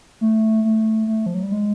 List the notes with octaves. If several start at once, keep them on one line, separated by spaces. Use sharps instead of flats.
A3
A3
A3
F3
F#3
G3
G#3